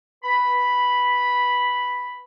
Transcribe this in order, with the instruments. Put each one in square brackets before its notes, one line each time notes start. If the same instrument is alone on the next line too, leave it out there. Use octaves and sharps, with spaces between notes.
[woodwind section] B4 B5